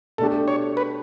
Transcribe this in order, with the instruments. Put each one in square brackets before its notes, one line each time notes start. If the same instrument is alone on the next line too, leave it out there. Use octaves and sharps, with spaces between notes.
[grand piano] B2 A3 D4 G4 [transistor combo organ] A4
[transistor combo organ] C#5
B4